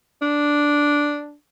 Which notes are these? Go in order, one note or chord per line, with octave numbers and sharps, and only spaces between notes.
D4